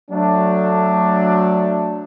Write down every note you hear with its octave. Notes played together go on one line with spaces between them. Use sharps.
F#3 A3 D4